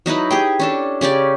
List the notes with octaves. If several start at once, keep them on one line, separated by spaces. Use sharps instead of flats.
F#3 D#4 E4 B4
G4 G#4 G5
C#4 D4 A4
C#3 C#4 G4 D5